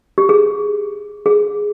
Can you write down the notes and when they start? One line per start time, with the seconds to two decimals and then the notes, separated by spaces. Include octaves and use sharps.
0.18 G4
0.29 G#4
1.26 G#4